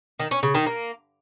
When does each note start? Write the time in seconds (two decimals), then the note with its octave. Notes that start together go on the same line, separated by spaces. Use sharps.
0.20 D#3
0.31 C#4
0.43 C#3
0.54 D#3
0.66 A#3